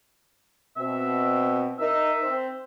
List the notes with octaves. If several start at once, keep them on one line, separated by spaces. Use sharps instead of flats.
B2 C4 E5
D#4 A#4 E5
C4 C5